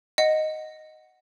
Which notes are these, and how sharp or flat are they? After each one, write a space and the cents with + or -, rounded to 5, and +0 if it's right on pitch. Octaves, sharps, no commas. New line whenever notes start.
D#5 +0 F#5 +0